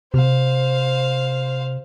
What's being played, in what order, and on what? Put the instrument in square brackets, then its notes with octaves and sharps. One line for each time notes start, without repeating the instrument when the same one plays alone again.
[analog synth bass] C3 [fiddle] C5 F5